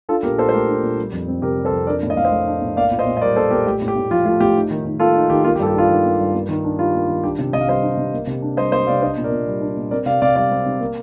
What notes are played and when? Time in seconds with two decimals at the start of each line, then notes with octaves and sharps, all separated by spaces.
0.09 D4 F4 A4
0.23 A#2 G4 A#4
0.38 A#2 A4 C5
0.49 C5
0.53 A3 G4 A#4
0.68 D4
0.83 A#2
0.99 G3
1.12 F2
1.28 C4
1.42 C3 G4 A#4
1.58 G3
1.65 A4 C5
1.72 F2
1.87 D4 A#4 D5
2.03 A2
2.10 D#5
2.17 A2 F5
2.25 C5 D#5
2.32 A3
2.47 D4
2.62 A2
2.76 A#3 D5 F5
2.91 A#2
2.99 C5 D#5
3.06 A#2
3.17 D#5
3.22 G3 A#4 D5
3.36 A#3 A4 C5
3.51 A#2 G4 A#4
3.66 A3 G4
3.82 A2
3.88 G4
3.96 A2
4.11 F3 F4
4.25 A3 F4
4.40 A2 G4
4.56 D#4
4.71 D#3
4.85 D#3
5.00 A#3 F4 A4
5.15 D#4
5.30 D#3 G4
5.44 A#3 F4
5.56 G4
5.59 G2 A4
5.67 G4
5.75 D4 F4
5.89 D#3
6.05 A#3
6.20 G2
6.34 A#3
6.49 D#3
6.65 D4
6.78 G3 F4
6.94 A#3
7.08 D#3
7.24 D4 G4
7.39 C3
7.53 C3 D#5
7.61 F5
7.68 G3 C5 D#5
7.83 D4
7.97 C3
8.13 A#3
8.27 C3
8.42 D4
8.57 G3 C5 D#5
8.72 A#3 C5 D#5
8.87 C3 D5 F5
9.02 D4 C5 D#5
9.17 A#2
9.24 A#4 D5
9.32 A#2
9.47 G3
9.61 D4
9.77 A#2
9.91 C4 A#4 D5
10.06 C3 D5 F5
10.22 C3 D5 F5
10.36 G3 D5 F5
10.51 C4
10.66 C3
10.81 A#3